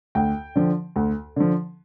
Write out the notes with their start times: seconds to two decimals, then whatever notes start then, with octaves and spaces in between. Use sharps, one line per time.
0.15 D2 G5
0.56 D3 F3
0.96 D2
1.36 D3 F3